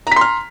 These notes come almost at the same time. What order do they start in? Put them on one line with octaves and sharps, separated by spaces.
A#5 B6 C6 F6